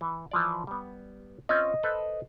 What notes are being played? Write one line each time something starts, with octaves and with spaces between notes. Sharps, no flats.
E3
E3 F3 D5
G3 B3
C4 C#4 F4 D#5
A4 B4 C5